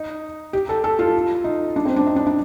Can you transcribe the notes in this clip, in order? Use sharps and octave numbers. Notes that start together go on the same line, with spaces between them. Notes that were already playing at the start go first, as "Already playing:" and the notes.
Already playing: D#4
G4
A4
A4
F4
D#4
D4
C4
D4
D#4
D4
D4